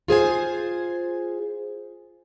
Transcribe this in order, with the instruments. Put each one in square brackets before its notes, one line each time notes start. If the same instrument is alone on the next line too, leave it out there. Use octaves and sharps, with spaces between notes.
[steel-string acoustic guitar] F4 G#4 C5 G#5